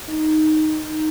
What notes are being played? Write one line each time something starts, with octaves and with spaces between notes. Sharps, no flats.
D#4